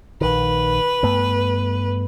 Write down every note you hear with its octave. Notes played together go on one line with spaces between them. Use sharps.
A#1 D#3 B4
G2 A3 B3